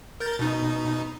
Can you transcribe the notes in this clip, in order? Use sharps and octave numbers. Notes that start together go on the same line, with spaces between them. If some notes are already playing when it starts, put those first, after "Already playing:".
A#4 G6 A6
B2 D#4